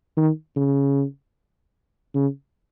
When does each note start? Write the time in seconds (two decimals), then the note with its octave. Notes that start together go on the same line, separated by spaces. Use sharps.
0.17 D#3
0.57 C#3
2.15 C#3